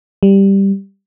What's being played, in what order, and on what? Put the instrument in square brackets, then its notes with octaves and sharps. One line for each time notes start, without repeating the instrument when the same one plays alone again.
[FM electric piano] G3